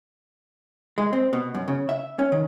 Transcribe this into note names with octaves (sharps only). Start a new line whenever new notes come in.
G#3
C4
B2
F#2
C#3
E5
C#4
D#3